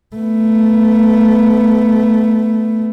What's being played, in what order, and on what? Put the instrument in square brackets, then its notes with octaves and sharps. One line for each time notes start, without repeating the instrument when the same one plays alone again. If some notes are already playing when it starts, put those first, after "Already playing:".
[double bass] A3 B3